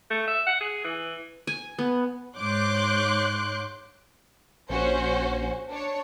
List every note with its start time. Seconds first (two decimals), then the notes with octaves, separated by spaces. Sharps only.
0.10 A3
0.27 E5
0.46 F#5
0.60 G#4
0.84 E3
1.47 G#5
1.79 B3
2.37 G#2 C#5 C6 D6 F#6 G6
4.70 A#1 C#4 F#4 C5
5.69 D4 C#5